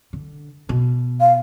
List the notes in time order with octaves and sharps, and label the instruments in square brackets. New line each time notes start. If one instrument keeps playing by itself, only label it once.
[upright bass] D3
B2
[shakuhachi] F5